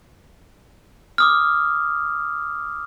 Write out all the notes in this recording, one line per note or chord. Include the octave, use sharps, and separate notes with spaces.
D6 D#6 F6